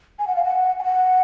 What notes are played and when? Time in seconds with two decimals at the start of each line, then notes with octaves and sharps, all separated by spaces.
0.19 G#5
0.27 F#5
0.36 F5
0.44 F#5
0.79 G#5
0.84 F#5